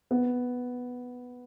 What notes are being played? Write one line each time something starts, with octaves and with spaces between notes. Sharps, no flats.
B3